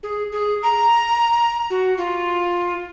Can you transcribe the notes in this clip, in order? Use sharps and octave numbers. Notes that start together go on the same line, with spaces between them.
G#4
G#4
A#5
F#4
F4